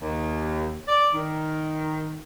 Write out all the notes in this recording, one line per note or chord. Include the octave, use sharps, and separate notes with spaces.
D#2
D5
D#3